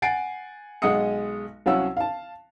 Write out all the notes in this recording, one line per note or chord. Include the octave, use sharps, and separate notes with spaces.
F#5 G#5 A6 C7 D7
B1 G#3 D#5 F#5 D#6 C#7
C2 F#3 C#4 F5 F#5 E6
F5 A5